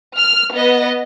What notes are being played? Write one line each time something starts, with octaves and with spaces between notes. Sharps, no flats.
F6
B3 D#5